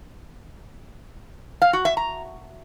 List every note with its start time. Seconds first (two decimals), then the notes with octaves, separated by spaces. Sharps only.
1.62 F5
1.73 F#4
1.85 E5
1.97 A#5